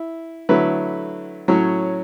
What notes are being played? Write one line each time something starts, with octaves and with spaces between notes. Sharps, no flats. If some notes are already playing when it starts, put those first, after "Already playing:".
Already playing: E4
D3 F#3 A3 E4 B4
A2 F#3 C#4